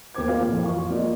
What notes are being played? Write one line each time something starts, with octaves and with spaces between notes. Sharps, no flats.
D#2 B3 C5 D6 G#6
A#3 F4 B4 C#5 F5
F2 A#2 E3 F3
F5 C#6
F4
A#3 F4 D5 D#5